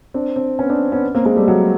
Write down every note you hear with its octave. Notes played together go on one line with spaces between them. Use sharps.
C4 D4
C4 D4
B3 C#4
C4 D4
B3 C#4
A#3 C4
G#3 A#3
G3 A3
F#3 G#3